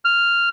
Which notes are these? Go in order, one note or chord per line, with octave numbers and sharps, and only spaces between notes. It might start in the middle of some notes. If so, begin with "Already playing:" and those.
F6